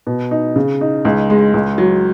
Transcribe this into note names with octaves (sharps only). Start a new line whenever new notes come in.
B2
D#4
C#3
D#4
C#2
G#3
C#2
F#3